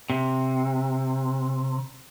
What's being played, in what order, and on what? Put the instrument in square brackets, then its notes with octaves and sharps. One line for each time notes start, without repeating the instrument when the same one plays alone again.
[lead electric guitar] C3